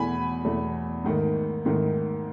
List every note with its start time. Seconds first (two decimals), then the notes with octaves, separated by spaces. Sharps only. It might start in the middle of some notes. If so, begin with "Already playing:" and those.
Already playing: E2 B2 A3 G#5 B5
0.44 E2 B2 A3
1.04 G#2 D#3 A3
1.65 G#2 D#3 A3